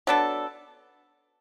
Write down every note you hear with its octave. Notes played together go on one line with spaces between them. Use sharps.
F#3 B3 D4 A4